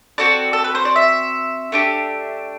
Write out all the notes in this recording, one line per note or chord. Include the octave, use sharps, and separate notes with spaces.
C4 F#4 A4 D5
A4
B4
C5
D5
E5
A3 D4 G4